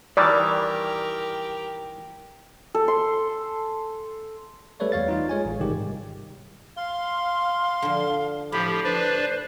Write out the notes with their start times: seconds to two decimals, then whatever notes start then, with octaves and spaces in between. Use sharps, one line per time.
0.17 D#3 E3 G3 G4 A#4 D5
2.75 A4
2.88 C6
4.80 G3 A3 A4 B4 C#5 D5
4.92 E2 C#5 F5 A6
5.08 D#4 F4 F5
5.29 G#3 C#5 G#5
5.45 A1
5.60 G#2 C3 D#3 G3 G#3 G4
6.76 F5 C6
7.82 D3 F3
8.52 A2 F3 G4 B5
8.84 D4 B4 C5 D5